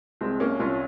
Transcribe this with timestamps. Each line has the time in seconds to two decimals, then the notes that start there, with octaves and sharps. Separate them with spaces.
0.21 C2 G#3 C4
0.40 A#3 C#4
0.60 C2 C#4 F4